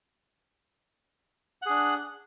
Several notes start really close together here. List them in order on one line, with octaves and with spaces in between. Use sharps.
F#5 G#4 D4